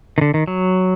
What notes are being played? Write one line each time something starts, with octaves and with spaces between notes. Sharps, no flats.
D#3
D3
D#3
F#3